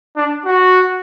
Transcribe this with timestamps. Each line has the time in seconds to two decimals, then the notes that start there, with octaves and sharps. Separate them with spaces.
0.16 D4
0.45 F#4